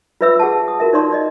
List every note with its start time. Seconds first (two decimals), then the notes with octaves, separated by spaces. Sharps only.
0.21 F4 B4 C#5 E5 B5 E6
0.39 G#4 F#5 A5
0.68 D#6
0.80 F4 F#4 A#4 E5
0.93 D#4 C#5 D5 C6
1.12 D5 D#5